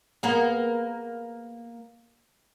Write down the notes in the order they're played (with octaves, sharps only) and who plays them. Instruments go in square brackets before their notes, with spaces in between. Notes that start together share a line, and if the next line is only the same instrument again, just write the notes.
[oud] A#3 B3 G#4